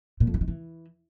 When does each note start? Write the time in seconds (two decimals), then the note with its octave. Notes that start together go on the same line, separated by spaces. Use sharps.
0.20 A#2
0.27 F2
0.34 E3
0.41 D#3
0.48 E3